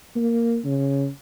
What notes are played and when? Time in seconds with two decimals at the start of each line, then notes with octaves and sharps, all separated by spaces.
0.16 A#3
0.65 C#3